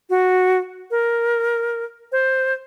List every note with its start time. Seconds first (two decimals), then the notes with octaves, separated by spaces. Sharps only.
0.10 F#4
0.91 A#4
2.12 C5